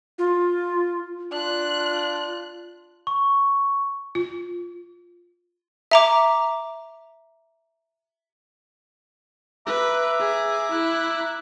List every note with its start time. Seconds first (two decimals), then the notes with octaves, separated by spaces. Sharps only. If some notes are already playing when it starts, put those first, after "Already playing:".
0.19 F4
1.32 D4 F4 F#6
3.07 C#6
4.15 F4
5.91 E5 A#5 D6
9.66 B4 E5 A#5 D6
10.20 G#4
10.72 E4 F#6